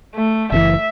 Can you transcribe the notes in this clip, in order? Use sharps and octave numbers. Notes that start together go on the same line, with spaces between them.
A3
F#1 B2 E3 E5